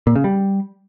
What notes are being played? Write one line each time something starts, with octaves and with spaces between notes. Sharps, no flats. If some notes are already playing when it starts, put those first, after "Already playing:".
A#2
C#3
G3